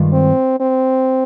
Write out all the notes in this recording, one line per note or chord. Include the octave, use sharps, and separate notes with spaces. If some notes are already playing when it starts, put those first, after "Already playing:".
Already playing: G2 D#3 G#3 F4
C4
C4